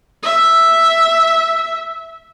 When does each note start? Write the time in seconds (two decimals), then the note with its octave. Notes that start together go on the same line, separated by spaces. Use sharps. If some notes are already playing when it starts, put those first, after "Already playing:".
0.23 E5